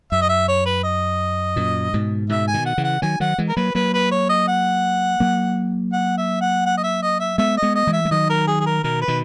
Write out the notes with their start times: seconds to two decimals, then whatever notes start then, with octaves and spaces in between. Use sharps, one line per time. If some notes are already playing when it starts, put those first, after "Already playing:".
0.12 F#2 E5
0.22 D#5
0.29 E5
0.48 C#5
0.66 B4
0.84 D#5
1.56 F#2 A#2
1.94 G#2 B2
2.29 G#2 B2 E5
2.48 G#5
2.54 B2 D#3
2.66 F#5
2.78 C#3 E3
2.84 F#5
3.02 D#3 F#3 G#5
3.20 D#3 F#3 F#5
3.38 E3 G#3
3.49 A#4
3.57 F#3 A#3 B4
3.75 F#3 A#3 B4
3.94 B4
4.11 C#5
4.30 D#5
4.47 F#5
5.20 F#3 A#3
5.93 F#5
6.18 E5
6.41 F#5
6.66 F#5
6.77 D#5
6.83 E5
7.02 D#5
7.20 E5
7.38 G#3 B3 E5
7.57 D#5
7.62 G#3 B3
7.75 D#5
7.87 E3 G#3
7.93 E5
8.05 G#3
8.11 D#3 F#3 D#5
8.30 A#4
8.47 G#4
8.61 G#4
8.66 A#4
8.84 B2 D#3 A#4
9.02 B4
9.08 B2 D#3